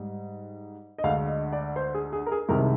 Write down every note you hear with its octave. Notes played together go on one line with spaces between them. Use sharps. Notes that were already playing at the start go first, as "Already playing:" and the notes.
Already playing: G#2 G3
D#5
D2 D3 G#3 F5
D#5
D5
C5
G#4
G#4
A#4
G#4
C2 C3 D#3 G#3 A#4